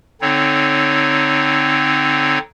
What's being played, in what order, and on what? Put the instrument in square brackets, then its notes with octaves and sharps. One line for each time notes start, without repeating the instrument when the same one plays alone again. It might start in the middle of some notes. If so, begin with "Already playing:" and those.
[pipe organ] D3 C4 D#4 C#5